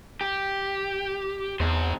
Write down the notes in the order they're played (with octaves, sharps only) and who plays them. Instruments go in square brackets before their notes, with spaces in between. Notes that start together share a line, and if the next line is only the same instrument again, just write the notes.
[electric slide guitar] G4
[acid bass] E2 [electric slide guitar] G#2 C4 C5